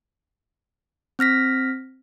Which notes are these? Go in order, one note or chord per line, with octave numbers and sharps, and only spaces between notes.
C4 F6 A#6 B6